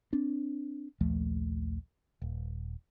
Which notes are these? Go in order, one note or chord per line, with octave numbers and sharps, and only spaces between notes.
C4 D4
A#1 D#2 F3 A3
D#1